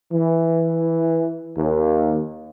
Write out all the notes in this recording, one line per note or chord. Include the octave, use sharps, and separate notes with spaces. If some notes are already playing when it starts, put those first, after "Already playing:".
E3
D#2